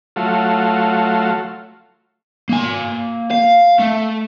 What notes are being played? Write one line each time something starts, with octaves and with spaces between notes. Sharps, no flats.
F#3 A3 F4
A#3 G#5
F5
A3